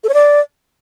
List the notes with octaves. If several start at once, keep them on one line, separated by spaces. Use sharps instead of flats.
A4
C#5
D5